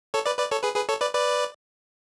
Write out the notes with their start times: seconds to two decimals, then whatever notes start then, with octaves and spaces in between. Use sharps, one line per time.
0.14 A4 C#5
0.26 B4 D5
0.38 B4 D5
0.51 A4 C#5
0.64 G#4 B4
0.76 G#4 B4
0.89 A4 C#5
1.01 B4 D5
1.14 B4 D5